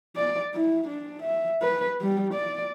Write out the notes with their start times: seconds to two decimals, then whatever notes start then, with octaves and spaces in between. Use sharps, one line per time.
0.16 D5
0.54 E4
0.88 D4
1.22 E5
1.62 B4
2.01 G3
2.34 D5